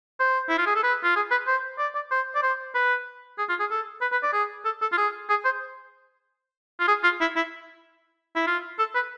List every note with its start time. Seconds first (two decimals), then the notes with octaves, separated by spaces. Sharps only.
0.20 C5
0.49 E4
0.58 F4
0.66 G#4
0.76 A4
0.83 B4
1.04 F4
1.16 G#4
1.31 B4
1.47 C5
1.78 D5
1.95 D5
2.11 C5
2.35 D5
2.43 C5
2.75 B4
3.38 G#4
3.49 F4
3.60 G#4
3.71 A4
4.01 B4
4.12 B4
4.23 D5
4.33 G#4
4.65 A4
4.82 A4
4.92 F4
4.98 G#4
5.29 G#4
5.45 C5
6.80 F4
6.88 G#4
7.04 F4
7.21 E4
7.36 E4
8.35 E4
8.47 F4
8.79 A4
8.95 B4